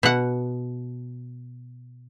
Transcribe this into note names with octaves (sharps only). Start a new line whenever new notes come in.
B2 F#5